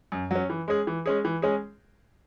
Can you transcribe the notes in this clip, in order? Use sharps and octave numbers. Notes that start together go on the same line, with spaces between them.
F#2
F#3 C#4
E3
G#3 C#4 G#4
E3
G#3 C#4 G#4
E3
G#3 C#4 G#4